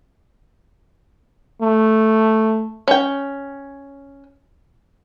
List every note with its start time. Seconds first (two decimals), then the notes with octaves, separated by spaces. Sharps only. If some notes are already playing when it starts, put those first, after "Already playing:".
1.62 A3
2.88 C#4 G5